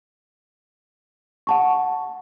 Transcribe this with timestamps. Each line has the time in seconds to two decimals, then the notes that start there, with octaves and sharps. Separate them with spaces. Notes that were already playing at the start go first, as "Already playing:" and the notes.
1.47 F#5 A5 C#6